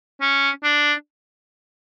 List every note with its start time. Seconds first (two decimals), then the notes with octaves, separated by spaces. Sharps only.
0.21 C#4
0.63 D4